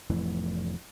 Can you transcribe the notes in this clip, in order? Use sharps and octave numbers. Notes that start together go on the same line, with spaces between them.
F1 F2 A2 E3